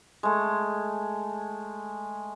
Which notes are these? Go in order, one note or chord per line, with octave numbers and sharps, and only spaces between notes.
G#3 A3